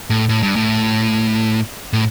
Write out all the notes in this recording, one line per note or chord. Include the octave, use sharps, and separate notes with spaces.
A2
A2
G2
A2
A2